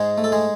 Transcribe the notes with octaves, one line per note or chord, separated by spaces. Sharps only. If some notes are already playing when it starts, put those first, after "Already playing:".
Already playing: G#2 G#3 G#4
A3
A4
G#3 G#4